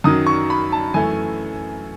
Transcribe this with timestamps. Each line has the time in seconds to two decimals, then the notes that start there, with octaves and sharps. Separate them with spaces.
0.04 F#2 D#3 F#3 D#6
0.27 C#6
0.50 B5
0.72 A5
0.94 F#2 E3 A3 C#4 G#5